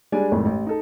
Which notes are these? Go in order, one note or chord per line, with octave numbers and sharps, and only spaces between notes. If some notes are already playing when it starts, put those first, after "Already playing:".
G3 G#3 D4 D5 G#5
G#1 F2 A2
A1
D#4 A4